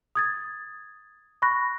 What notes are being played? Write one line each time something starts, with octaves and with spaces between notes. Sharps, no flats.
D#6 G#6 A6
B5 C#6 F#6 A#6